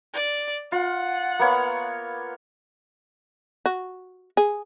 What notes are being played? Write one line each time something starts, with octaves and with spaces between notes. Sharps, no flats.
D5
F4 F#5
A#3 B3 C#5
F#4
G#4